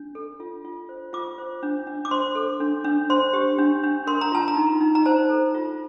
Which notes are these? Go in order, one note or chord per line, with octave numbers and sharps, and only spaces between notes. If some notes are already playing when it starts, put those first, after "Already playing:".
Already playing: D4
A4
F4
F4
C5
F4 D6
C5
D4
D4
D6
C5 C6
A4
D4
D4
C5 C6
G4
D4
D4
A#4 C6
A#5
F4 A5
A#5
D#4
D#4
A#5
C5 A5
A4
F4